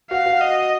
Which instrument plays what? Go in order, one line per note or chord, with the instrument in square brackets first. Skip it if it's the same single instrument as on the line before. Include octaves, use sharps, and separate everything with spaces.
[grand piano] F#4 [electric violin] F5
[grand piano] F#4
[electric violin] D#5